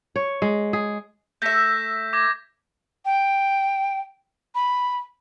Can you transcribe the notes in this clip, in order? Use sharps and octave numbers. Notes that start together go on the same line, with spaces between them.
C#5
G#3
G#4
A3 E5 G6 A#6 B6
D6 G#6 A#6
G5
B5